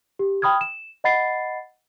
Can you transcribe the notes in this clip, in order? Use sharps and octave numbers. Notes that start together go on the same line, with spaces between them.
G4
G5 B5 D#6 F6 G#6
E7
D#5 F#5 B5 A6 C7